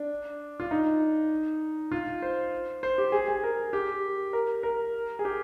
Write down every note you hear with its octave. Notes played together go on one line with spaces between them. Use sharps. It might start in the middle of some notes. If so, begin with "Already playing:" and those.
Already playing: D4
F4
D#4
F4
C5
C5
G4
G#4
G#4
A#4
G4
A#4
A#4
G#4
G4